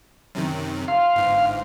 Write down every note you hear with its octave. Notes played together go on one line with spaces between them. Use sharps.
F#2 C3 D#3
F5 C6
G1 G#2